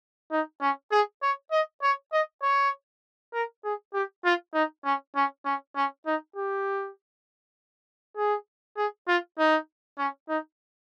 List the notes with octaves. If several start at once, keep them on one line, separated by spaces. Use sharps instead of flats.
D#4
C#4
G#4
C#5
D#5
C#5
D#5
C#5
A#4
G#4
G4
F4
D#4
C#4
C#4
C#4
C#4
D#4
G4
G#4
G#4
F4
D#4
C#4
D#4